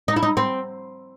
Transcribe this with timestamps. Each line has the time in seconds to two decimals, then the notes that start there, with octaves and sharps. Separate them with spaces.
0.08 D#4
0.16 E4
0.23 D#4
0.37 C4